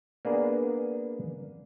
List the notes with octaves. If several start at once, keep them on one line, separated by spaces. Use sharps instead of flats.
A#3 B3 D4 G#4